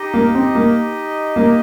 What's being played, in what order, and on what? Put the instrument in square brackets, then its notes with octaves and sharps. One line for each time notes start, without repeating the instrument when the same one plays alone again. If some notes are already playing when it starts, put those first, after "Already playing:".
Already playing: [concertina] D#4 G4 D#5
[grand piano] A#3
C4
A#3
A#3